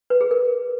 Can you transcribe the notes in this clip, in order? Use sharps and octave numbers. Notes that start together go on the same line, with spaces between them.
B4
G#4
A#4